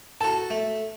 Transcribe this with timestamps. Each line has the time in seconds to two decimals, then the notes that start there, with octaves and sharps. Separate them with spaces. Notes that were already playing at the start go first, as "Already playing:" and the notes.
0.21 F#4 A4 A5
0.50 A3